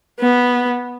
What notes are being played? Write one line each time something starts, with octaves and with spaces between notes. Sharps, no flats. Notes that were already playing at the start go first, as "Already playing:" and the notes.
B3